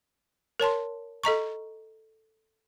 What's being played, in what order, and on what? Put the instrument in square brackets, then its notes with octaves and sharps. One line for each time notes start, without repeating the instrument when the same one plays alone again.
[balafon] A#4 C#5 A5 C6
A4 D#5 A#5 C#6